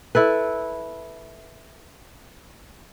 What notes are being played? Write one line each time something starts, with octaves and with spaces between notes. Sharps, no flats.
E4 A4 B4